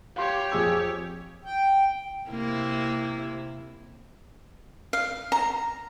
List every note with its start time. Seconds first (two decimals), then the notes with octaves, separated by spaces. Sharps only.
0.16 G4 C#5 F5 C6
0.52 F2 G#4 E6
1.45 G5
2.30 C3 A#3 E4
4.93 F5
5.32 A#5